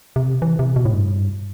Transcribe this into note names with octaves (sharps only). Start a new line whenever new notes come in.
C3
E3
C3
B2
A2
G2